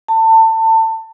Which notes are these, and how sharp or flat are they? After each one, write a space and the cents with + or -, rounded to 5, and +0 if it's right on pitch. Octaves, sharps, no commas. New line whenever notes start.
A5 +25